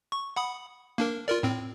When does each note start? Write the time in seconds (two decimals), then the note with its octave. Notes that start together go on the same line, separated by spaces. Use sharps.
0.12 C#6
0.36 F#5 B5 D#6
0.98 A#3 D4 A#4
1.28 F4 A#4 D5
1.43 A2 C4